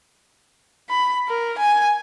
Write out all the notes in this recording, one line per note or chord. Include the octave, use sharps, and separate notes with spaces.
B5
A#4
G#5